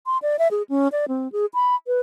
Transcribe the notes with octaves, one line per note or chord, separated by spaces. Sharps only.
C6
D5
E5
G#4
C#4
D5
C4
G#4
B5
B4